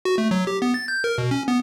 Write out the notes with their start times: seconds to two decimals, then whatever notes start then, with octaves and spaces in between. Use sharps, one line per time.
0.05 F#4
0.18 A3
0.31 F#3
0.47 G4
0.62 B3
0.74 A6
0.88 G6
1.04 A#4
1.18 B2
1.31 C#4
1.48 B3